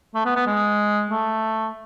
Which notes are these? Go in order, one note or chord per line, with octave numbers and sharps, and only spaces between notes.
A3
B3
B3
G#3
A3